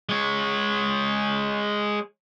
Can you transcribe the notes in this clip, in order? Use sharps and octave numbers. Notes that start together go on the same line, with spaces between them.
G#3 C#5